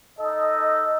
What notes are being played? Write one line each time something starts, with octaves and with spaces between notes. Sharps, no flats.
D#4 A4 D#5